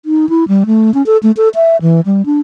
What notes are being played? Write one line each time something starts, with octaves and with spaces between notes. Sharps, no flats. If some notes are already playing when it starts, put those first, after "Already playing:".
D#4
E4
G3
A3
C#4
A4
A3
A4
E5
E3
G3
D4